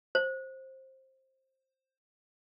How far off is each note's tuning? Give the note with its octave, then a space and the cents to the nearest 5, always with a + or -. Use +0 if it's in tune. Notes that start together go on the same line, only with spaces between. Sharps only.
C5 +15